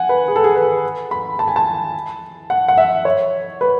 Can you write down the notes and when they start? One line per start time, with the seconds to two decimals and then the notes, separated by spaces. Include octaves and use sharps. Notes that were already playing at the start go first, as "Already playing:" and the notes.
Already playing: F#5 G#5
0.09 B4
0.28 G#4
0.36 A4
0.44 G#4
0.56 B4
1.11 B5
1.39 A5
1.48 G#5
1.56 A5
2.50 F#5
2.68 F#5
2.77 E5
3.05 C#5
3.61 B4